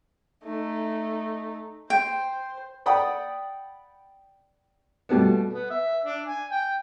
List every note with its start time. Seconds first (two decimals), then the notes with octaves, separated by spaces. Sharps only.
0.43 A3 D#4
1.90 C5 G5
2.86 D5 F#5 G5 B5 D#6
5.09 B2 G3 A3 B3
5.53 B3
5.70 E5
6.05 D4
6.28 G#5
6.52 G5